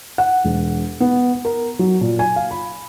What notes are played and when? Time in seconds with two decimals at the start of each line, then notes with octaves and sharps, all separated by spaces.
0.18 F#5
0.45 E1
1.00 B3
1.45 A#4
1.79 F#3
2.01 A#2
2.19 G#5
2.36 F5
2.51 B5